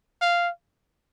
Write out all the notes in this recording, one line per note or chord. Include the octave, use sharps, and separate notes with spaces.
F5